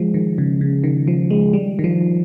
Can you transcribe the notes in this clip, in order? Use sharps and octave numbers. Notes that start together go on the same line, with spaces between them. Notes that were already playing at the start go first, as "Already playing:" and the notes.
Already playing: F3 G#3
D#3
C#3
C#3
D#3
F3
G#3
G3
D#3
F3